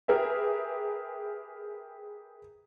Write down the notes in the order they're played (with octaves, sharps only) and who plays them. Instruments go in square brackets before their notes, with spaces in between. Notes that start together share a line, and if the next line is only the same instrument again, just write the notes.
[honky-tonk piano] G4 G#4 A#4 B4 E5